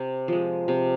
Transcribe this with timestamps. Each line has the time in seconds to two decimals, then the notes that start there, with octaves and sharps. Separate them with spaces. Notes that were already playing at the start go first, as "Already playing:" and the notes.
Already playing: C3
0.28 F3 G#3
0.68 C3